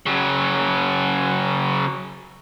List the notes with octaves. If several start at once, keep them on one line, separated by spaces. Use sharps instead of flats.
C#3 F#3